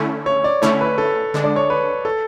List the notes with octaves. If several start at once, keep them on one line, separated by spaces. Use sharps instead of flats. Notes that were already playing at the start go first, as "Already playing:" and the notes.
Already playing: D3 A3 C#4 E4
C#5
D5
D3 A3 C#4 E4 C#5
B4
A4
D3 G#3 D4
D5
C#5
B4
A4